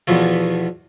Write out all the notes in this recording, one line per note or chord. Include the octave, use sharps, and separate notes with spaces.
E2 B2 E3 F3 A3